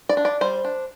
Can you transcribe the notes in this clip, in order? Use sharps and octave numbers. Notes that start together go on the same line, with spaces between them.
D5
D4
D5
G3 C5
D4